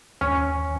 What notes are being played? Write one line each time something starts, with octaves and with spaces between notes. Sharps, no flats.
D#2 C#4